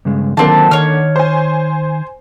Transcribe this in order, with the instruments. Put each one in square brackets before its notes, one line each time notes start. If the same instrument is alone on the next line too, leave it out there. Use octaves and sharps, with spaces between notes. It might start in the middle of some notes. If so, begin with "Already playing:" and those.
[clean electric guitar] G2 C#3 G#3
[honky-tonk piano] D3 A#3 [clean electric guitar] D#3 F#3 [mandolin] C4 A5
[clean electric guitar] D#3 [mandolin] C#5 F6
[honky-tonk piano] C5 G#5